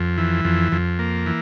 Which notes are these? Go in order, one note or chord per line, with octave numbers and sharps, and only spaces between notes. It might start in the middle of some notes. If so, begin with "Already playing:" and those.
Already playing: F2
E3
F2
F2
A#3
E3